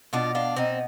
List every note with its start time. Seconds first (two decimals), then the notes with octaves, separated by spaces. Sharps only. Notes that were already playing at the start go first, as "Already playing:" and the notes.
0.13 B2 D4 F4
0.35 D4 F4
0.56 B2 C4 D#4